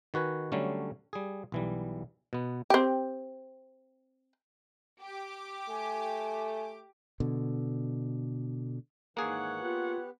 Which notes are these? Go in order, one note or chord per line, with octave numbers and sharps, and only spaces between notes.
D#3 F#4 B4 G#5
D3 F#3 G3 A3 C#4
G3 G#4
B1 E3 G3
B2 B3
C4 G4
G4 D6
A3 G#5
B2 D3
G#2 D#3 E3 A#3 G#4 C#5 F#5
B3 F4 G4 B4